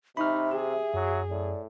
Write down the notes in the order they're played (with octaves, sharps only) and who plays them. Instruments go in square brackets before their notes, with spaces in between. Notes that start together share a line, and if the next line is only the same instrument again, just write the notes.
[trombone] C3 [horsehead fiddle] D#4 [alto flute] E5 [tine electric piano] B5 C#6 F6
[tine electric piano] G4 [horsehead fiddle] G#4
[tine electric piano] F#2 [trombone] F#3
[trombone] A2 [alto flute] D5